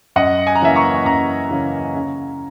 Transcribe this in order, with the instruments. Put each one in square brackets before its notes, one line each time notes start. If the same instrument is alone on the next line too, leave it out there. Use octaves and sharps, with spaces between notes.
[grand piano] F#2 D#5 F#5
G#5
A#5
C#3 E3 A#3 C#4 E5 G#5
A#5 C#6
F#2 A#5 C#6
C#3 E3 A#3 C#4
C#3